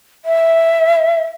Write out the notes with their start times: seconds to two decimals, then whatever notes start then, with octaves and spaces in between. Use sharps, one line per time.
0.25 E5